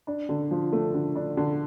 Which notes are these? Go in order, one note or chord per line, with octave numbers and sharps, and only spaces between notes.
D4
D3
F3
A3
D3
D4
D3